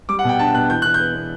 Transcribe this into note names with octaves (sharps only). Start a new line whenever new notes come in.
G3 D6
F#5
B2 G5
D4 A5
B2 F#6
E3 G6
E3 F#6
G6
B3
B3